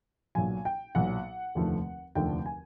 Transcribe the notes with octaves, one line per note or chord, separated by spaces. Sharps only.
B1 A#2 F#3 G#5
G5
B1 A#2 F#3 F#5
F1 D#2 D3 F3 A3
F1 D#2 D3 F3 A3 G5
G#5